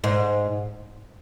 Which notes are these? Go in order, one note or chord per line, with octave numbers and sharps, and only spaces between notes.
G#2